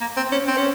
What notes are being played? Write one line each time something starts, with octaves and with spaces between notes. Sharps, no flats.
A#3
C4
C#4
C4
C#4